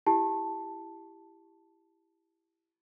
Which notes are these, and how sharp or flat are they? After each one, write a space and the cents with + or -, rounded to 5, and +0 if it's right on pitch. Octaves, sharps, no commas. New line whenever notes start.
E4 +15 G4 +0 A5 +0